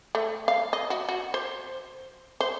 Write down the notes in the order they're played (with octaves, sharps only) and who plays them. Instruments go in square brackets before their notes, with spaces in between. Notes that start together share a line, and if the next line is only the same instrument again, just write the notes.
[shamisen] A3
F5
D#5
F#4
F#4
C5
C5